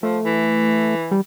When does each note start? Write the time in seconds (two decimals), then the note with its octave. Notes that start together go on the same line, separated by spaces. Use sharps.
0.03 F3 A3
0.25 E3
1.11 G3